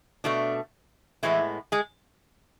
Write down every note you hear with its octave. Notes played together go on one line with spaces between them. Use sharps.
B2 A3 D4
A2 E3 G#3 B3 E4
G#3 G#4